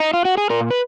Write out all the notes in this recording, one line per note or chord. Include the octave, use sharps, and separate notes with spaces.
D#4
F4
F#4
G#4
A#2 A#4
B4